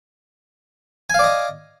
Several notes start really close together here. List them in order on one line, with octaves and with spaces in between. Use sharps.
G#5 F5 D5 D#5